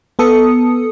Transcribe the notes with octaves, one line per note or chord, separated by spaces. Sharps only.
B3 A4 D#6 C#7